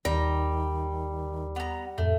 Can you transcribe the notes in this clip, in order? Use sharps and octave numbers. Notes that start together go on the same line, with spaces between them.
D#2 D#3 G3 A#5
B3 F#5 A#5
F2 A2 A3